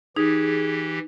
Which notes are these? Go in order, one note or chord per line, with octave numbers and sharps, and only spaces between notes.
E3 D#4 G4 G#4